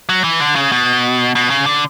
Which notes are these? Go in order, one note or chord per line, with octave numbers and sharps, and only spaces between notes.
F#3
E3
D3
C#3
B2
B2
C#3
D3